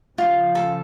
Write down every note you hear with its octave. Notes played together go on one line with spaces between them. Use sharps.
C#3 F3 F4
A4